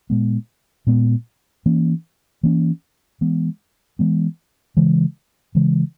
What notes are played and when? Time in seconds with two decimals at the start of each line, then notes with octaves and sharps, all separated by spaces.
0.10 A#2 G#3 B3
0.87 A#2 G#3 B3
1.66 E3 A#3 C#4
2.43 E3 A#3 C#4
3.21 E3 G#3 B3
3.99 E3 G#3 B3
4.77 C#3 E3 G#3
5.55 C#3 E3 G#3